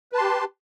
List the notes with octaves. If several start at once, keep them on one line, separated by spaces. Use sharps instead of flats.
G4 B4 A5 C6